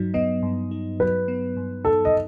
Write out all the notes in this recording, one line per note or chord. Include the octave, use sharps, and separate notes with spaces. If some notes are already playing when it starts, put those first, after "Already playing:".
Already playing: G2 F#3 D#4
B3 D#5
G2
D#4
F#3 B4
B3
G2
D#4 A4
D#5